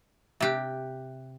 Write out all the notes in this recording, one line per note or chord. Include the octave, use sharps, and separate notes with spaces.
C3 G4 E5 F#6